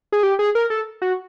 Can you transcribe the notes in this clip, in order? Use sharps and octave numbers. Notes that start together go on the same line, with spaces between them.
G#4
G4
G#4
A#4
A4
F#4